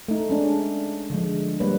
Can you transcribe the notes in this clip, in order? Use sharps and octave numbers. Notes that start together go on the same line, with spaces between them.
A3 D#4
G#3 C#4 D4
D3 F3 G#3
G3 A#3 B4 C#5